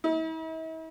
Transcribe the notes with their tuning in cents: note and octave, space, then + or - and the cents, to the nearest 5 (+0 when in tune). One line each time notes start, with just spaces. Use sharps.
E4 -45